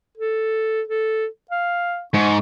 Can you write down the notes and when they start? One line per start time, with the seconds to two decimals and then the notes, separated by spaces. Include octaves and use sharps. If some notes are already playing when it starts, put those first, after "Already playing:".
0.18 A4
0.88 A4
1.51 F5
2.14 G#2 C#6